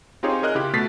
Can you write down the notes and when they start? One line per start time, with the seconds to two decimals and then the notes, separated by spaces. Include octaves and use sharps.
0.23 C4 D#4 F4 G4 G#4 C#5
0.43 G#4 A#4 D#5 F6 F#6
0.55 C#3 E4 F4 G4
0.73 B2 A3 A6 B6 C7